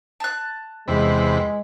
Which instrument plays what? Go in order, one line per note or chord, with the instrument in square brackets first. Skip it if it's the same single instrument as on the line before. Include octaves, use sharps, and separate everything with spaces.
[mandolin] A5 F#6
[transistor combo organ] E2 C3 B4 [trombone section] G#3